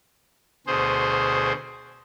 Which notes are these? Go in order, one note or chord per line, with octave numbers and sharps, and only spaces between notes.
D2 B2 G#4 C5